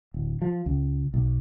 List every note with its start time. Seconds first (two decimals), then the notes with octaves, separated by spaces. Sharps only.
0.14 D1
0.42 F3
0.66 C#2
1.14 B1